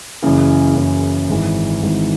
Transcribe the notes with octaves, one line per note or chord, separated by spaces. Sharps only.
F#1 F#2 C#3 E3
F#1 F#2 C#3 E3
G#1 G#2 E3
G#1 G#2 E3